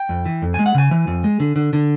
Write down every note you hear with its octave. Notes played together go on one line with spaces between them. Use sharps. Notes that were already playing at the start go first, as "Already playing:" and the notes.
Already playing: G5
F2
E3
F2
G#3 G#5
F#5
C#3 G#5
E3
F2
G#3
D3
D3
D3